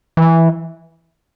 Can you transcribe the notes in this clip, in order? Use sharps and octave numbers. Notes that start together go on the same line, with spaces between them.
E3